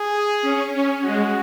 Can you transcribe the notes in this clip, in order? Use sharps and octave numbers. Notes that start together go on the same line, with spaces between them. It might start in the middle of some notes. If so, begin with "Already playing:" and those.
Already playing: G#4
C#4
C#4
G#3 F#4